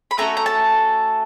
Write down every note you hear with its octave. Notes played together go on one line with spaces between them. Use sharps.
B5
A3 C#4 F#4 A4 A#5
A#5
A5